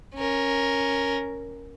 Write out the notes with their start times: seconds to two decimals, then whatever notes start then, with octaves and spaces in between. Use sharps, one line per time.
0.15 C#4 A#4